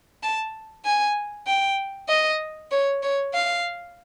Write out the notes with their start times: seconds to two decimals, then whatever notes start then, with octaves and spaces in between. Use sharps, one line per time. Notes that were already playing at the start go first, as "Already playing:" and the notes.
0.23 A5
0.85 G#5
1.47 G5
2.09 D#5
2.71 C#5
3.03 C#5
3.34 F5